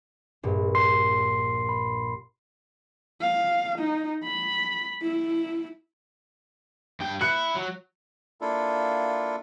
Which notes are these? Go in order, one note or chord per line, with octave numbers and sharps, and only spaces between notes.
A#1 G2
C6 C7
B5
F5
D#4
B5
E4
G2 G5
E4 F#6 C#7
F#3
A#3 D4 E4 F4 A4